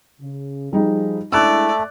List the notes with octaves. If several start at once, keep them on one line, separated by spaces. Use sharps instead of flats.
C#3
F3 G3 D#4 G#4
G#3 A3 D4 E4 D5 E6 F#6